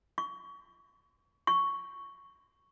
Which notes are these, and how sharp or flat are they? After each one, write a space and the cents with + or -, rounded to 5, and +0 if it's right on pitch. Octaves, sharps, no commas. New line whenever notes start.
C#6 +30
C#6 +5